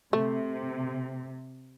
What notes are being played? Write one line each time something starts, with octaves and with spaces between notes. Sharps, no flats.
C3 A3